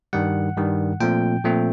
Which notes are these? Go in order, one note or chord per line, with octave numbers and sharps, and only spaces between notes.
G2 D#3 G3 F#5
G2 D#3 G3
A#2 F3 A3 C4 G5
A#2 F3 A3 C4